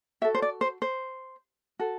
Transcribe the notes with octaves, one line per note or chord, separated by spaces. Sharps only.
F#4 A4 E5
C5
D5
C5
C5
F#4 A4